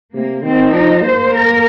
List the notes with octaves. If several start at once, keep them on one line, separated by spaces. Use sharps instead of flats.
C3 A#3
D#3 C4
F3 D#4
A#3 C5
A#4